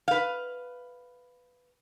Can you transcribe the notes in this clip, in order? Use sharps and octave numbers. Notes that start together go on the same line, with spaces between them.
B4 F5